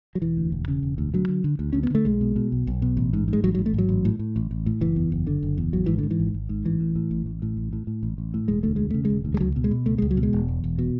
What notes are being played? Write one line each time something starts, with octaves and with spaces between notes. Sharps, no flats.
F#3
E1 E3
D2
E1
C#3
E1
D2
D2 F#3
D3
D3
D2
D2 C#4
B3
D3 A3
B1 G#3
B2
B2
B1
B1
B2
A1
G#2
G#2
G#3
A1 F#3
F#3
A1
A3
G#2 F#3
A1
A2
A2
A1
A1
A2
F#1 E3
E2
F#1
D3
F#1
E2
G#1 F#3
G#2 E3
G#2 D3
E3
G#1
G#1
G#2
A1 E3
A2
A2
A1
A1
A2
A1
A2
A2
A1
A1
A2
E1 G#3
D2 A3
E1 G#3
C#3 A3
G#3
E1
D2
G#3
C#2 F#3
B2
G#3
B2
C#2 A3
C#2 G#3
F#3
B2
G#3
E1
E2
E1
B2